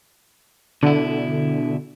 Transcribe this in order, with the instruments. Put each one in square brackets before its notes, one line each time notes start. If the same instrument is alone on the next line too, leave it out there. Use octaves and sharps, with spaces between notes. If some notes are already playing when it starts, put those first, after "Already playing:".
[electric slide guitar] B2 E4 [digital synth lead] D3